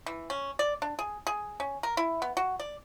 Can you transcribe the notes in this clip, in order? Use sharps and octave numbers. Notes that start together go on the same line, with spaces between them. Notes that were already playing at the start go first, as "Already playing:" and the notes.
E3
C#4
D5
D4
G#4
G#4
C#4
A#4
E4
B3
F#4
D5